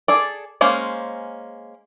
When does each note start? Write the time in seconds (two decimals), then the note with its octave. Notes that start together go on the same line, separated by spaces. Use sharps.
0.08 G#4 A4 D5
0.61 G#3 A#3 C#4 C5